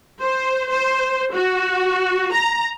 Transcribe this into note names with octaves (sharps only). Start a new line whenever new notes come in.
C5
C5
F#4
A#5